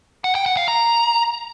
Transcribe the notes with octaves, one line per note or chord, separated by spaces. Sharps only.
F#5
G5
F#5
F5
A#5